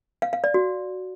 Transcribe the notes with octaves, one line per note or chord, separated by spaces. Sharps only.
F5
F5
D5
F#4